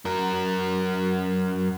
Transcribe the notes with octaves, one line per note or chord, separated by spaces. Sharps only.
F#2 A#4